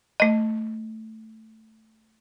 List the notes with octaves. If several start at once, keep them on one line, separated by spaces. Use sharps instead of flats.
A3 D#5